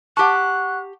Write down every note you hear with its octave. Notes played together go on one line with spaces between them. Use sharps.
G4 F#5 A5 C#6 F#6